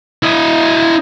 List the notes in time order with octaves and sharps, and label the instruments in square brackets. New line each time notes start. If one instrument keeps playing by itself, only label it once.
[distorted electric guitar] E4 D#5